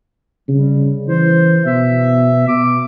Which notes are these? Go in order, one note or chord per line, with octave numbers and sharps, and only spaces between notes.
C#3 G3
E3 C5
B2 E5
B2 D6